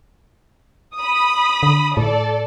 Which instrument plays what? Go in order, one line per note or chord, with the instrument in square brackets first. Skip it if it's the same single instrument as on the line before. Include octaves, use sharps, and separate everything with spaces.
[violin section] B5 D#6
[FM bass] D3
[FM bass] A2 [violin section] A4 D5